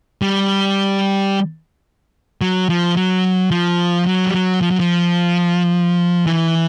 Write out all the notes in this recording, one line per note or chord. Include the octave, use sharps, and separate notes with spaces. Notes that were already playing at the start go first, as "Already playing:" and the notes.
G3
F#3
F3
F#3
F3
F#3
G3
F#3
F3
F#3
F3
E3